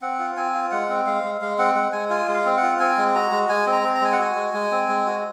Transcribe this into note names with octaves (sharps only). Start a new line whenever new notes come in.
C4 F#5
F4
C4 G#5
F4
G#3 F#5
C4
G#3 F5
G#3
G#3 F5
C4 F#5
G#3 F#5
G#3 G#5
F4 G#5
G#3
F5
C4
F#5
F4
C4 G#5
G#3
F#4 A#5
G#3
G#3 G#5
C4
A#5
C4
A#5
G#3 G#5
F#5
F#4 G#5
G#3
G#3
C4
G#3
F#4